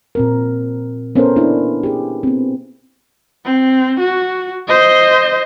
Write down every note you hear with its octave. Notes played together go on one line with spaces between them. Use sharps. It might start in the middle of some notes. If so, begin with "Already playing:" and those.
A#2 C4 A#4
B3 C#4 A4 A#4 C5
A#3 D4 E4 B4
G4 G#4
B3 C4
C4
F#4
C5 D#5